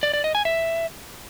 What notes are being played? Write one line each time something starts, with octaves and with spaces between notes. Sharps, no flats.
D5
D5
D#5
G#5
E5